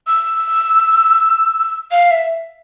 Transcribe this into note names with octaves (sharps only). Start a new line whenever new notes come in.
E6
F5
E5